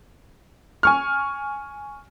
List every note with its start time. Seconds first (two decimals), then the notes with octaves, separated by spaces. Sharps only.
0.83 G#5 C#6 F6